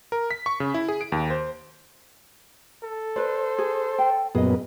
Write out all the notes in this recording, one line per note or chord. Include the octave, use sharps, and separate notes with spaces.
A#4
B6
C#6
C#3
E4
G#4
D7
D#2
C5
A4
B4 C5 D5
G#4
G5
F#2 A#2 B3 G#4 D#5